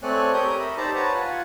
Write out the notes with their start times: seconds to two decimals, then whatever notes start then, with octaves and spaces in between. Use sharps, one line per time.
0.03 A3 C4 C#5 D5 G#5 F#6
0.34 G4 A#4 C#5 D#6 G6
0.59 D#5 E5 B5
0.77 D#4 G4 C5 D5 A5 A#5
0.95 B4 C#5 F#5 A5 A#5
1.14 F4 F#5 G#5